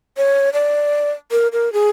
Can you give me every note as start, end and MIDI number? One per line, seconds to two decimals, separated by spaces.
0.17 0.50 73
0.53 1.11 74
1.31 1.48 70
1.53 1.72 70
1.73 1.90 68